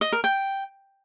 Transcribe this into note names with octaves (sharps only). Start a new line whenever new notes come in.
D#5
A#4
G5